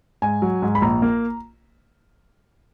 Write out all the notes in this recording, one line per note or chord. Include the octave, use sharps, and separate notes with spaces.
G#2 G#5
F#3
G#2
B5
A#1 A#5
A#3